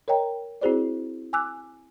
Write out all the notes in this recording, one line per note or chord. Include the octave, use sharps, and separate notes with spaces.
A#4 C#5 D#5 G5 A#5
C4 E4 F#4 G#4 C5 D5
G#5 D6 E6 F#6